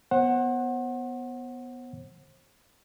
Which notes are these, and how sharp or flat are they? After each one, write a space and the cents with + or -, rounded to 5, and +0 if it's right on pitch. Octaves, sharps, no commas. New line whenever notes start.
B3 +0 C5 +40 F#5 +0